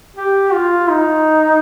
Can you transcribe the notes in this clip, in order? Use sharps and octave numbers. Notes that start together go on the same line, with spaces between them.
G4
F4
D#4